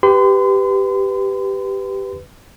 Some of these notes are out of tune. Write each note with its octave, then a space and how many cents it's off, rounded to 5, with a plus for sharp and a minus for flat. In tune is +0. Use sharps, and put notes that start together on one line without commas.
G4 +0 B4 +10 C6 -40